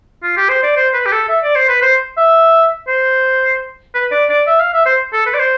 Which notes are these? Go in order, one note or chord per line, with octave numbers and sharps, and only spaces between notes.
F4
G4
C5
D5
C5
B4
G4
A4
E5
D5
C5
B4
C5
E5
C5
B4
D5
D5
E5
F5
E5
C5
A4
B4
D5
C5